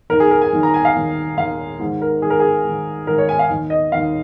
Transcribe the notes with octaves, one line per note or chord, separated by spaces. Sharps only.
D#2 D#3 A#4
G#4
A#4
G#5
D#2 D#3
A#5
G#5
F5
D#2 D#3
D#2 D#3 F5
G#2 D#3
A#4
G#2 D#3 G#4
A#4
G#4
G#2 D#3
G#2 D#3 A#4
C#5
G#5
F5
D#2 D#3
D#5
D#2 D#3 F5